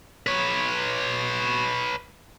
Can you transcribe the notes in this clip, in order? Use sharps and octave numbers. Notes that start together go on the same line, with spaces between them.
B4 C#5